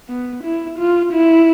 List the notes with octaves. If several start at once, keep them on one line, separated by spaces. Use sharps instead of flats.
B3
E4
F4
E4